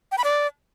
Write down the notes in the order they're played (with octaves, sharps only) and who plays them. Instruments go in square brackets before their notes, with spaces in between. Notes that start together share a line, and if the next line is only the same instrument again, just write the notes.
[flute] G5
B5
D5